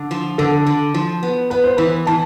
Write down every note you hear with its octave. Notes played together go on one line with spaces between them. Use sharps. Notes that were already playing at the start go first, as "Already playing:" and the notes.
Already playing: D3
F3
D3 A4
D3
F3
B3
B3 B4
C5
E3 B4
E3 A5